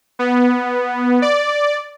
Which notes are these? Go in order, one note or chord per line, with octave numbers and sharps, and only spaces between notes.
B3
D5